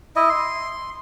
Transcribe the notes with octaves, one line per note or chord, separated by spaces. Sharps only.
E4 D#5
C6